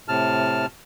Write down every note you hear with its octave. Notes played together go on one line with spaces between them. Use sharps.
A2 C3 A5 F6